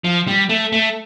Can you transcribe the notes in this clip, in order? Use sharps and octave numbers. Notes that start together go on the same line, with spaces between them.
F3
G3
A3
A3